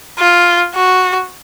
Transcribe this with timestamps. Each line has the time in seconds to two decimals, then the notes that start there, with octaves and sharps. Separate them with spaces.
0.19 F4
0.75 F#4